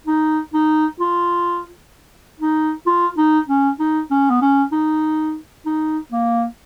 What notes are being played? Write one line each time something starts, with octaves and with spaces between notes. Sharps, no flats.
D#4
D#4
F4
D#4
F4
D#4
C#4
D#4
C#4
B3
C#4
D#4
D#4
A#3